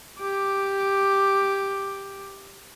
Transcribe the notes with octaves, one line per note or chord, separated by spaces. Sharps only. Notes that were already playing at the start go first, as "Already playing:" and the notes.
G4 D6